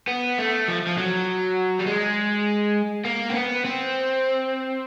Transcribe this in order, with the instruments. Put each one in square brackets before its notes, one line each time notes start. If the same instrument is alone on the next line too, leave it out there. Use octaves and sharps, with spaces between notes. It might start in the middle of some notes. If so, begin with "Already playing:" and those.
[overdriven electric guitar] B3
A3
F3
F3
F#3
G3
G#3
A#3
C4
B3
C4